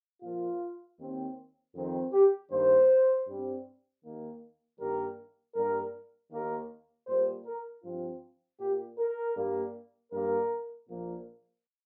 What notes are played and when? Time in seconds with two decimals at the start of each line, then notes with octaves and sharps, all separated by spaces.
0.22 A#2 F3 A#3 F4
0.99 D#2 D#3 C4
1.75 F2 D#3 C4
2.13 G4
2.51 G2 D#3 A#3 C5
3.26 G2 G3 C4
4.03 D#2 D#3 A#3
4.79 G2 D#3 G3 A#3 A#4
5.55 G2 G3 A#3 A#4
6.32 D#2 D#3 A#3 A#4
7.07 A#2 G3 A#3 C5
7.45 A#4
7.83 G2 F3 C4 F4
8.59 A#2 A#3 G4
8.98 A#4
9.36 G2 G3 A#3
10.12 G2 G3 A#3 A#4
10.88 A#1 A#2 F3 A#3